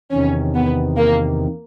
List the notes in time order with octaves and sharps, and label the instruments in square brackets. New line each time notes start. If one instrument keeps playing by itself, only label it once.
[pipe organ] E2 C3 D#3 [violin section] C#4
[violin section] B3
A#3